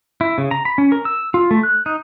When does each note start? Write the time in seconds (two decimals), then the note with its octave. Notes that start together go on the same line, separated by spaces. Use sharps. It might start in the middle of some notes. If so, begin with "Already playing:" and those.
0.21 E4
0.38 C#3
0.51 A#5
0.65 B5
0.78 C#4
0.92 A#4
1.05 E6
1.34 F4
1.51 A3
1.63 F#6
1.86 D#4